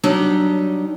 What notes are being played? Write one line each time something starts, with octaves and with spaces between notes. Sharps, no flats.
F#3 G3 D4 D#4